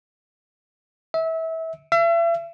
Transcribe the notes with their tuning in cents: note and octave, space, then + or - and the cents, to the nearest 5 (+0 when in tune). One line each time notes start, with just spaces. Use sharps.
E5 -25
E5 +40